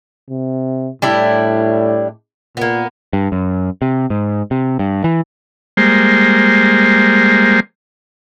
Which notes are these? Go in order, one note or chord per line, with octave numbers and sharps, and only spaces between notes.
C3
A2 G3 D4 E4
A#2 A#3 B3
G2
F#2
C3
G#2
C3
G2
E3
G3 G#3 A#3 C5